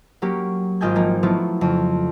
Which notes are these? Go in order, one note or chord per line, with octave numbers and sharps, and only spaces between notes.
F#3 A#3 C#4 G4
G#1 F4 D#5 G5 G#5 G6
F3 A#3 D#4
F3 F#3 A3 B3 E4 F4
F2 C#3